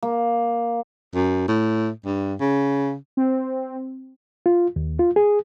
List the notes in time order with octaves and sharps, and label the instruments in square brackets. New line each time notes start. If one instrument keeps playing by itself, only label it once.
[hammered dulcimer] A#3
[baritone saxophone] F#2
A2
G2
C#3
[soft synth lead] C4
[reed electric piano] F4
D#2
F4
G#4